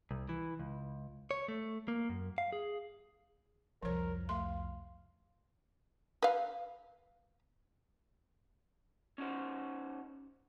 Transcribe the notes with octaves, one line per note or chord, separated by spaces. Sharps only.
C2
E3
C#2
C#5
A3
A#3
F#2
F5
G#4
C2 F2 F3 A#4 C#5
A3 F5 C6
B4 F5
C#4 D#4 F#4 C5